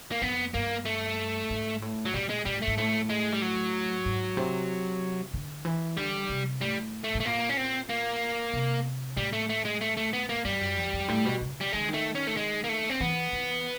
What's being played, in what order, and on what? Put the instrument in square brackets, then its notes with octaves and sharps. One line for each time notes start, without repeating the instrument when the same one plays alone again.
[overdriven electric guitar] A#3
[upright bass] F2 [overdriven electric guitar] B3
[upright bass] G2 [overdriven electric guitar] A#3
[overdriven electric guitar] A3
[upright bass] G#2
A2
[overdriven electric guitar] F#3
[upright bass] A#2 [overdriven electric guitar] G3
[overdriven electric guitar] G#3
[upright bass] A#2 [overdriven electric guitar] G3
[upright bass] A2
[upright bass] G#2 [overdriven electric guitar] A3
[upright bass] A2 [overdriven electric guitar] A3
[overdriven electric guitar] G#3
G3
F#3
[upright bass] G#2
C3
D3
E3
[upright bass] D3 [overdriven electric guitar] G3
[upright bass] C3
[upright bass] A2 [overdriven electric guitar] G3
[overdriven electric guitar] A3
[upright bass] A2
[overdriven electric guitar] A3
[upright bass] A#2 [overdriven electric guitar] A#3
[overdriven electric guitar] C#4
C4
A#3
[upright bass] C3
[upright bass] A2 [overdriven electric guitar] G3
[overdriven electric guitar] A3
A3
G#3
A3
A3
B3
A#3
[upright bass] G2 [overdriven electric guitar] G3
[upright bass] F#2
F2
F2
A2
B2
C#3
[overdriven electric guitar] G3
[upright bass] D#3 [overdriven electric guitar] G#3
[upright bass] D3
D#3
[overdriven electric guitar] A3
C#4
A3
G#3
A#3
A3
C4
[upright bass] E3 [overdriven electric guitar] B3
[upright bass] E3